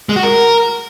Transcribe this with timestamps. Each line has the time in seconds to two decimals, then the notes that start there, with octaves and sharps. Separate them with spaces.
0.09 G#3
0.16 F#4
0.23 A#4